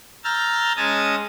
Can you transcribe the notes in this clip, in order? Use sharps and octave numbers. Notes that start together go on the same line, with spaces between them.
A#5 E6 F6 G6 A6
G#3 C#4 A5 D#6 G#6 A#6